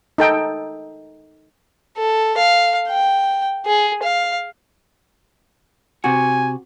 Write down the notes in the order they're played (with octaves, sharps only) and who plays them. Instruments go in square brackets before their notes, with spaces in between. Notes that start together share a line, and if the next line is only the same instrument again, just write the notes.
[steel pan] D#4 A4 G5
[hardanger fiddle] A4
F5
G5
G#4
F5
[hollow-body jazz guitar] C3 F#4 [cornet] G#5